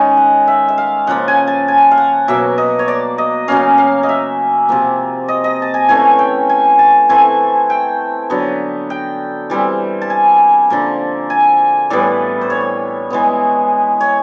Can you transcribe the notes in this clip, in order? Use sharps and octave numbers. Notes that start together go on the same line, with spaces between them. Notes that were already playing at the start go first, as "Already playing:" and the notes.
Already playing: D#3 G#3 C#4
F#5
E5
E5
F5
C#3 F3 A#3 F#5
G#5
A5
G#5
F5
F#5
B2 F#3 A#3 E5
D#5
C#5
D5
D#5
C#3 F#3 A#3 C#4 F5
F5
D#5
E5
C3 F3 A#3
D#5
D#5
A5
G#5
E3 A3 C#4 G#5
G5
G#5
A5
E3 A3 C4 G#5
G5
D3 F#3 B3
G5
E3 G3 C4
A5
G#5
D3 F3 A#3
G#5
A2 E3 G3 B3 D5
C5
C#5
E3 G#3 B3
C#5